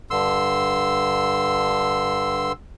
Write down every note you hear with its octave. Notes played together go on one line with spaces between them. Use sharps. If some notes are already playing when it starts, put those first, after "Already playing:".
G2 D3 C6 E6